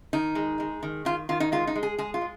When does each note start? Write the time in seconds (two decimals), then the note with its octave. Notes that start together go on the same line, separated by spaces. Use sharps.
0.13 D#3 D#4
0.35 G#3
0.60 G#3
0.83 D#3
1.05 D#3 F4
1.29 D#3 F4
1.40 D#4
1.52 G#3 F4
1.67 D#4
1.75 G#3
1.83 G#4
1.98 G#3 G#4
2.14 F4
2.21 G#3